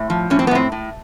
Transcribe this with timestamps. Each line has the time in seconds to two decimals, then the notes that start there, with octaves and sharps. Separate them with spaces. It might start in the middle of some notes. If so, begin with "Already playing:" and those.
Already playing: A2
0.10 F3
0.30 A2 C#4
0.39 C4
0.47 B3
0.51 A2 C4
0.72 A2